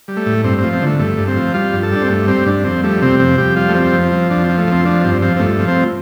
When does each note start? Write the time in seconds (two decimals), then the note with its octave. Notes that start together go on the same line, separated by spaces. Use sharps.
0.08 G3
0.17 A3
0.26 A2
0.44 G2 C4
0.58 C4
0.63 F3
0.73 C4
0.82 D3 A3
0.99 G2 A3
1.18 G2
1.28 C4
1.36 F3
1.54 G3 F4
1.73 G2
1.83 A4
1.91 G3 D4
2.02 C4
2.10 G2 A3
2.28 G3 C4
2.46 G2 D4
2.64 F2 C4
2.83 G3 A3
3.02 C3 C4
3.19 F2 C4
3.38 F2 G4
3.56 G3 F4
3.69 A3
3.75 F3 C4
3.93 F2
4.03 C4
4.12 F3
4.30 F2 D4
4.44 C4
4.49 F3
4.58 A3
4.67 F2 C4
4.85 F3 D4
5.04 G2 C4
5.22 F3 C4
5.37 C4
5.40 G2 A3
5.59 F3
5.68 C4